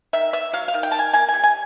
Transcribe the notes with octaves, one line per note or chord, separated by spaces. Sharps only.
D#3 E5
B3 E5
F#3 F5
F5
D#3
G5
D#3 A5
G#5
A#3 G#5
G#5
G3
G#5